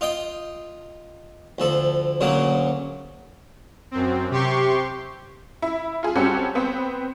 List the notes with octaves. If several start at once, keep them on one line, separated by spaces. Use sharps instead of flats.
F4 D#5 G5
D2 F3 A4
D2 A#2 C#3 F#3 A#3
F#2 C4
C3 G4 C6 C#6
E4
F4 G#4
G3 C4 C#4 F#4 A4
B3 C4